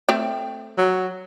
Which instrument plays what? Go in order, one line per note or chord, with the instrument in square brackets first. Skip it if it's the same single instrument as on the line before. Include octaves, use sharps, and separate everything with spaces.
[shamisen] A3 C4 G5
[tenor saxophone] F#3